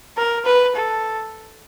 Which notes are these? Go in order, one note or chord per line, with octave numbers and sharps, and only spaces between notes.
A#4
B4
A4